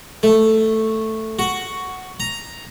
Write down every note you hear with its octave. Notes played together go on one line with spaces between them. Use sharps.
A3
F#4
A#5